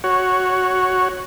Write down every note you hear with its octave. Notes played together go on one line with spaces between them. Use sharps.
F#4 C#5